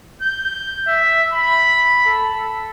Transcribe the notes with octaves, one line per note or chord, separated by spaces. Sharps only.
G6
E5
B5
A4